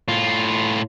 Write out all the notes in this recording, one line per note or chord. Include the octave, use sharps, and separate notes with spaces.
A2 F4